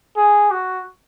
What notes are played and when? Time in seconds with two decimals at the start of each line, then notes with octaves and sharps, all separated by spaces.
0.17 G#4
0.51 F#4